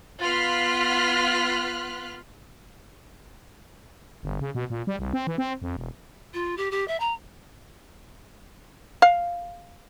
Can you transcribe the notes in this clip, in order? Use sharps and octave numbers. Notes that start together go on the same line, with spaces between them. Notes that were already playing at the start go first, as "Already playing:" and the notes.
B3 F4 C6 F6 F#6 B6
G1
C#3
B2
A#2
G3
C2
C4
E3
C4
F2
E1
F4
G4
G4
E5
A#5
F5